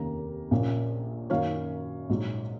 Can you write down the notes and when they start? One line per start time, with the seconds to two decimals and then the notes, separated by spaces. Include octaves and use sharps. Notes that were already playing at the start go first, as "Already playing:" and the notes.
Already playing: F1 D#2 D#3 A#3 C#4 A#5
0.51 A#1 A#2 F3 A#3 C#4
1.30 F#2 D#3 F#3 A#3 C#4 C#5 F5
2.10 A#1 G#2 F#3